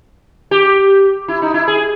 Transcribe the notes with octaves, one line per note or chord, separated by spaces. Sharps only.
G4
E4
D#4
E4
G#4